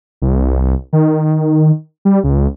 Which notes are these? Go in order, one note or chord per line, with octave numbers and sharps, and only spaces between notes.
C2
D#3
G3
C#2